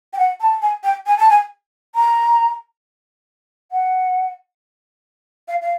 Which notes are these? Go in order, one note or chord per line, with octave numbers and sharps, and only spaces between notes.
G5
F#5
A5
G#5
G5
G#5
A5
G#5
A#5
F#5
F5
F5